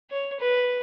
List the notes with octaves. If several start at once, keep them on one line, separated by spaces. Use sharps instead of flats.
C#5
B4